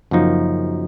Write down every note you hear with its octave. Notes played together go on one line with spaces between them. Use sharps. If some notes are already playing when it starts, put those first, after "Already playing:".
F#2 C#3 F3 A#3 D#4